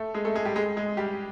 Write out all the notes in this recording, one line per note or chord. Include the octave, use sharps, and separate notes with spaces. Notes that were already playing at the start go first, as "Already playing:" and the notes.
Already playing: A3 A4
G#3 G#4
A3 A4
G#3 G#4
G3 G4
G#3 G#4
G#3 G#4
G3 G4